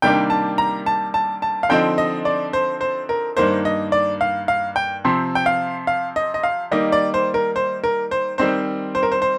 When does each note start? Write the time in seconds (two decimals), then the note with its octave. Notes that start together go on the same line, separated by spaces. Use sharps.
0.02 C3 D#3 G3 A#3 D4 G5
0.30 A5
0.58 A#5
0.86 A5
1.14 A5
1.42 A5
1.63 F5
1.69 D3 F3 C4 D#4 G5
1.98 D#5
2.25 D5
2.53 C5
2.81 C5
3.09 A#4
3.37 G2 D#3 A#3 C5
3.65 D#5
3.92 D5
4.21 F5
4.48 F5
4.76 G5
5.04 C3 F3 C4
5.35 G5
5.46 F5
5.87 F5
6.16 D#5
6.34 D#5
6.43 F5
6.71 D#3 G3 A#3 D#4 D#5
6.92 D5
7.14 C5
7.34 A#4
7.56 C5
7.84 A#4
8.11 C5
8.38 D#3 G3 C4 D#4 C5
8.95 C5
9.03 A#4
9.12 C5
9.22 C5